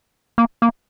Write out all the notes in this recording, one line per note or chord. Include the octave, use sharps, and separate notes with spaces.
A#3
A#3